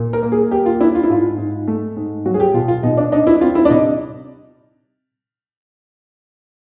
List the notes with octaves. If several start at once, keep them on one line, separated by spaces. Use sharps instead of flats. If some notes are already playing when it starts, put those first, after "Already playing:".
Already playing: A#2
A#4
A#3
G#4
A#3 G4
F4
D4 E4
F4
E4
G#2 F4
G#2
A3
G#2
F#3 F#4
G#4
G4
B2 F4
F4
B2 D#4
D4
D4 D#4
E4
C4 F4
E4
D4
C3 D#4